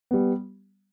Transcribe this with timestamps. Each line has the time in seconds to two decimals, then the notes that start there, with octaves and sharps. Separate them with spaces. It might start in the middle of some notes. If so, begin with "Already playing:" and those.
0.11 G3 B3